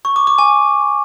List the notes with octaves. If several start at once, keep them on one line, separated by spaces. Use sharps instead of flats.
C#6
D6
D6
G#5